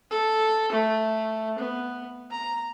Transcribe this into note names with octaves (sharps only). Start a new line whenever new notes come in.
A4
A3
B3
A#5